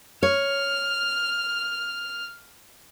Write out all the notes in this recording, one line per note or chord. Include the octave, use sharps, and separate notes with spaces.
C#5 F6